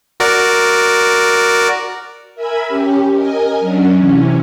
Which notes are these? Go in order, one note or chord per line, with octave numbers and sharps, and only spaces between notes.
F#4 A#4 D5
A#4 E5 G#5 B5 G#6
C#4 G4
A#4 D#5 G#5
F#3 C#4 D4
C3 E3 C#4